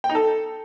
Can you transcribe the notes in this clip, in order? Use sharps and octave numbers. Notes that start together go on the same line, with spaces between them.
G5
D#4
A4